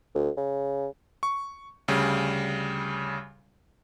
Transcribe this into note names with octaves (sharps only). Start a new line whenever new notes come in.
D2
C#3
C#6
D2 C#3 G3